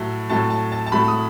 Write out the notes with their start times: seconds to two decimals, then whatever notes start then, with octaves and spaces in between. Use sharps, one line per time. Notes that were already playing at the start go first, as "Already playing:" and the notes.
Already playing: A2 F#3 A3
0.30 A2 F#3 A3 A5
0.50 A5
0.72 A5
0.86 A5
0.92 A2 F#3 A3 B5
1.08 D#6